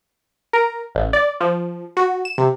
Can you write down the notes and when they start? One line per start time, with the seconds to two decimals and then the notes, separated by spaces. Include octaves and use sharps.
0.53 A#4
0.95 A1
1.13 D5
1.41 F3
1.97 F#4
2.25 E7
2.38 C3